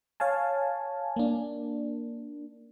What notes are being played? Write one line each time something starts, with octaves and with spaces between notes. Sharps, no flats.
C#5 F5 G#5 A5
A#3 D4